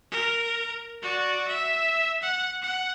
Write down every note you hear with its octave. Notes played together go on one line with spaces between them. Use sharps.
A#4
F#4 D5
E5
F#5
F#5